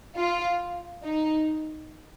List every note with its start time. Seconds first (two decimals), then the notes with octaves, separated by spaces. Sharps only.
0.16 F4
1.04 D#4